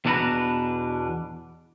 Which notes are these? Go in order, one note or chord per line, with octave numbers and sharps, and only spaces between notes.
E2 B2 D4 A4 B4 A#5